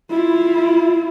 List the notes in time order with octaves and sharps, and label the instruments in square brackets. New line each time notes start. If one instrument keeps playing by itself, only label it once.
[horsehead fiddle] E4 F4